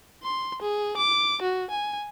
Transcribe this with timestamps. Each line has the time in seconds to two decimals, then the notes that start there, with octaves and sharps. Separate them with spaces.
0.23 C6
0.62 G#4
0.97 D6
1.42 F#4
1.71 G#5